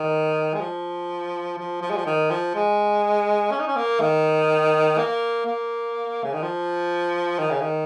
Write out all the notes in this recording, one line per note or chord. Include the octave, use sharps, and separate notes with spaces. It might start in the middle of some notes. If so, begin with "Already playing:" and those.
Already playing: D#3
G#3
F3
F3
F3
G#3
F3
D#3
F3
G#3
C#4
D#4
C#4
A#3
D#3
A#3
A#3
C#3
D#3
F3
D#3
C#3
D#3